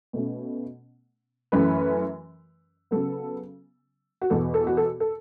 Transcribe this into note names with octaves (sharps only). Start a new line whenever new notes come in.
B2 A3 C#4
F#2 E3 A3 C#4 B4
C#3 F#3 B3 A4
F#4
E2 B2 B3 A4
A4
F#4
A4
A4